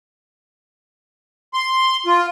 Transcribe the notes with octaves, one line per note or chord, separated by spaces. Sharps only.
C6
F4